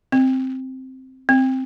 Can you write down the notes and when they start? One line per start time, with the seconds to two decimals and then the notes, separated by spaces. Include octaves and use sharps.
0.12 C4
1.29 C4